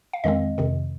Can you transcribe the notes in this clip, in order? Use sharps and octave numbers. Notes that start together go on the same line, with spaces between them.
F5
F2 D#3 G#3 C4 D#5
F2 C3 D#3